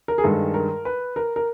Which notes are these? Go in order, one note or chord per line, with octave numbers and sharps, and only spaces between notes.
A#4
G#4
G2 D#3 G#3 A4
A#4
B4
A#4
A#4